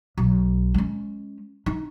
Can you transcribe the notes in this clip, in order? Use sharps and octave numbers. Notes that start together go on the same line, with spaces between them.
B1
G#3 C#4
D#4